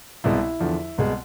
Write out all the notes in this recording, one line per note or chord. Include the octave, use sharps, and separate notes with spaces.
C2 B2 G#3 E4
E2 D3 F3
C2 B2 G#3